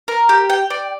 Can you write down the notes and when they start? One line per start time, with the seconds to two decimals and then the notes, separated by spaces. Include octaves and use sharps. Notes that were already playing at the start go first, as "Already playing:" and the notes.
0.08 A#4
0.29 G4
0.50 G5
0.70 D5